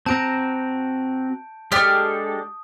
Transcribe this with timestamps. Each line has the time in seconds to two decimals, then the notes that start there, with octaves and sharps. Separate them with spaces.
0.06 C4 F#4 A5 A#5 G6 D7
1.72 G#3 D4 G4 A4 D#6 F6